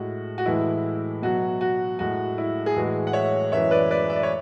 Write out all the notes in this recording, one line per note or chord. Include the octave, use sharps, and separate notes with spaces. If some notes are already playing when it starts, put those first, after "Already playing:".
Already playing: A2 G#3 F#4
F#4
A2 E3 G#3 E4
B2 F#3 F#4
F#4
A2 G#3 F#4
E4
G#4
A2 E3 G#3 F#4
F#5
C#5 E5
F#2 E3 G#3 C#5 E5
B4 D5
B4 D5
E5
D5
C#5